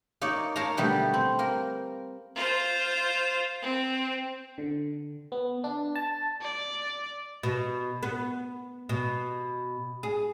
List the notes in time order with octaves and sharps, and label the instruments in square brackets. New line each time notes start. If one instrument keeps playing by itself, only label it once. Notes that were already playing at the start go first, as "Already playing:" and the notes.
[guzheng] A#3 D#4 C#5 D5
A#4 C#5 F5 A5 A#5
B2 D3 G3 A3 B3
C4
A#3 A#4
[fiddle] F4 C5
C4
[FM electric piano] D3
B3
D4
A5
[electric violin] D5
[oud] B2
B3
B2
G#4